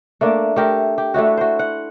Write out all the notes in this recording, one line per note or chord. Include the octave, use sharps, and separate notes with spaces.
A3 A#3 D4
A3 G4 A#4
G4
A3 D4 E4 F#4
F#4 C5
F#5